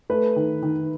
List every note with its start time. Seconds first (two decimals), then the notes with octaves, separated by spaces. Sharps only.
0.10 A3 B4
0.36 D#3
0.63 D#3